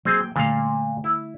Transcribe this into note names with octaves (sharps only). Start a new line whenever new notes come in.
F#3 A#3 C4 G#4
G5
A#2 D3 G3 A3 F5
E4